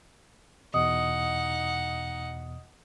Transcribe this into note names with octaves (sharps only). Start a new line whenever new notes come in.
E2 B2 D#4 D#5 F#5 D#6